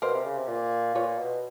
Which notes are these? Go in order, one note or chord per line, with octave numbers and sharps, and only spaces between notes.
B2 A#4 C5
C3
C#3
C3
A#2
A#2 B4 C#5
B2